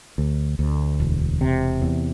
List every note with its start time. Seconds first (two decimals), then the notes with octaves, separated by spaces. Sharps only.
0.18 D2
0.59 D2
1.00 E1
1.41 C3
1.82 E2